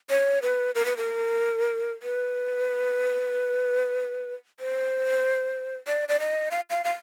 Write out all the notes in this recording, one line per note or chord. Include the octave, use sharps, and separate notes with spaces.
C#5
B4
A#4
B4
A#4
B4
C5
D5
D5
D#5
F5
F5
F5